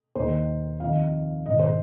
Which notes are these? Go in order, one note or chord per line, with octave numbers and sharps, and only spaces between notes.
D#2 D#3 C5
F2 D#3 F5
G#2 D#3 D#5
C5